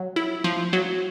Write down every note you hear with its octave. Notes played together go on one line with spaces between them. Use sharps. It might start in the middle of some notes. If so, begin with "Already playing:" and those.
Already playing: F#3
E4
F3
F#3